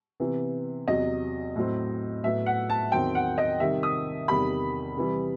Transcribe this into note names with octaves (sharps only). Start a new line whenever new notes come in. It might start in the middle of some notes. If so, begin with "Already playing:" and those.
C3 E3 B3
E2 C3 F#3 D#5
A2 F#3 C4
A2 F#3 B3 E5
F#5
A5
E2 D#3 F#3 C4 G5
F#5
D#5
C3 D#3 G3 E5
D#6
E2 C3 D#3 G3 B5
C3 E3 G3